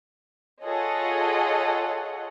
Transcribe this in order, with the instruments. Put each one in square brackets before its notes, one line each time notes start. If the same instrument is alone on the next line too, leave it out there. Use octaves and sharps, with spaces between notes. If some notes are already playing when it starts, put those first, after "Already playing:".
[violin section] F4 G#4 A4 C#5 D#5 F#5